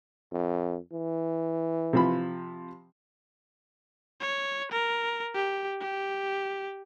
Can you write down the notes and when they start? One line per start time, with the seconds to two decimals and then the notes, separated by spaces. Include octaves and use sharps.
0.32 F2
0.92 E3
1.93 C3 F3 B5
4.21 C#5
4.72 A#4
5.35 G4
5.81 G4